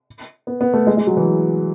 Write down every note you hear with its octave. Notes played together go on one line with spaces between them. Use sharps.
B3
B3
A3
G#3
G#3
F#3
E3